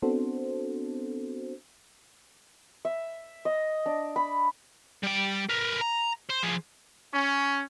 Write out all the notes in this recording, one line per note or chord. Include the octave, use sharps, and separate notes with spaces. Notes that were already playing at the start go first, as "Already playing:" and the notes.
B3 C4 D4 F#4 A4 C5
E5
D#5
D4
B5
G3 G5
A#4 B4
A#5
C5
F3 G#4
C#4